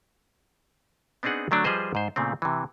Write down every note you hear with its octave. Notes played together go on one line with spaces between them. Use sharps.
B3 C4 D4 D#4 G#4 F#5
D3 F#3 A3 D4
F3 G3 G#4 B4 C5 D#5
G#2 C5
A#2 C#3 A3 C4
C3 E3